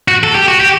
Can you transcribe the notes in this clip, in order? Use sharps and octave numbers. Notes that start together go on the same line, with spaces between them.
F#4
A4
G4
F#4
G4